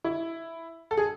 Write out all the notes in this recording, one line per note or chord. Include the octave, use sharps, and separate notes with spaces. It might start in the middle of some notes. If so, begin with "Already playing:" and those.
E4
A4
G#4